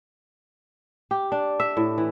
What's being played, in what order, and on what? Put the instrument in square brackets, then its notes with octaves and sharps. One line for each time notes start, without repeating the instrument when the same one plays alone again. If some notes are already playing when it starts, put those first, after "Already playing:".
[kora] G4
D4
E5
A2
E3